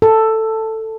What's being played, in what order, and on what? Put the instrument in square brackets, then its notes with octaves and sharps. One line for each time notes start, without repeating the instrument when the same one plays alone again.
[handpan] A4